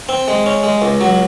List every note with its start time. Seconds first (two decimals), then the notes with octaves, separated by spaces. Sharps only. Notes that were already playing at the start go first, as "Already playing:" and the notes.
0.09 C4
0.28 G#3
0.46 C#4
0.63 G#3
0.82 C#2
1.01 F#3